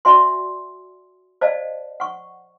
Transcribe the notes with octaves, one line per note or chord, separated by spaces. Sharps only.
F#4 D5 E5 F#5 G#5 C6
C5 D5 D#5 F5 A5
F#5 C#6